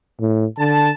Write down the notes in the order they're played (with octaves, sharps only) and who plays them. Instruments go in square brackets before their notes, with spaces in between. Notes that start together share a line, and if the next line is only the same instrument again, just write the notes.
[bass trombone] A2
[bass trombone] D3 [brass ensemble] A5